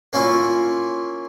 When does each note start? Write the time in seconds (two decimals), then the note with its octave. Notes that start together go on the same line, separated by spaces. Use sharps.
0.13 A#3 C#4 E4 F4